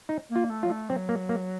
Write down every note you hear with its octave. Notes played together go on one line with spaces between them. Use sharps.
D#4
A#3
F4
A3
F#3 F4
A3
F#3 C4
A#3
A#3